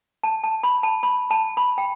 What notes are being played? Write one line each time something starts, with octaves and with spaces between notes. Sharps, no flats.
A5
A5
B5
A5
B5
A5
B5
G5